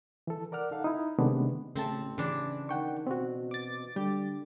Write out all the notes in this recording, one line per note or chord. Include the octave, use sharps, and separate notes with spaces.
E3 A4
A#4 D5 F#5 F6
D#4 A4 F5 F#5
D#4 E4
C3 D#3 G#3 A3 B3 D4
A1 C#3 A3 C4 A5
C#3 E3 D4
D#3 F#5 G5 C#6
B2 C4 F#4
D6 A6
D3 G3 G4